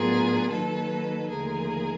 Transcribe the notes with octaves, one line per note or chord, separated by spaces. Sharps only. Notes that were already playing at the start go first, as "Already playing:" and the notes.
Already playing: A2 F#3 B3 D4 F4 G#4 A#4
D#3 F#3 A#3 D#4 A4 B4
D#2 D3 F3 A3 G#4 A#4